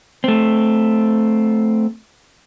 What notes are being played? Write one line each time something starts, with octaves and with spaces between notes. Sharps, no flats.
A3 C4